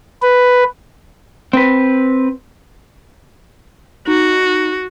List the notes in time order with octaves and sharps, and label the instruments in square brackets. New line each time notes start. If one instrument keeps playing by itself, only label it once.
[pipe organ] B4
[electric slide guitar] C4 B4
[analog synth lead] D#4 [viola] F#4